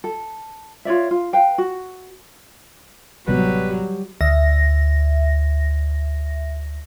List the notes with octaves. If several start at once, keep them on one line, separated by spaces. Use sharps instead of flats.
A4
F4 C#5 D5 E5
F4
B4 F5 G5
F#4
A1 C3 F#3 G3 B3 B4
D2 E5 A#6